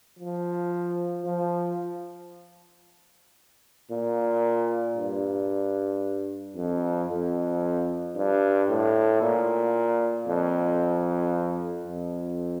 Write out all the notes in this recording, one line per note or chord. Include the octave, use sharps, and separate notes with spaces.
F3
F3
A#2
G2
F2
F2
G2
A2
A#2
F2
F2